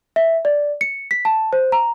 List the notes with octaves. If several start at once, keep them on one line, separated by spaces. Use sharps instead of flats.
E5
D5
C#7
B6
A5
C5
A#5